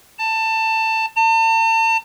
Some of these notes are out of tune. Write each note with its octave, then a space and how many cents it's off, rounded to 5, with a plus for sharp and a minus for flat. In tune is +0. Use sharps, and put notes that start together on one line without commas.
A5 +20
A5 +40